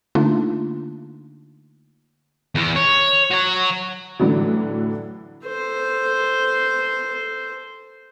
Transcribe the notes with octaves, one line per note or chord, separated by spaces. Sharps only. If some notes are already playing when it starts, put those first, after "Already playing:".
D3 A3 A#3 D4 D#4 F4
E2 E3
C#5
F#4 C#5
A2 D3 E3 F#3
A4 C5